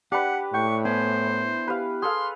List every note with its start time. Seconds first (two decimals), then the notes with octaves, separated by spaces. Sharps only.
0.12 D4 G4 B4 F#5
0.54 A2 G5 C#6
0.85 B3 E4 C5 G#5
1.68 G4 B4 F5
2.02 G#4 A4 F5 C6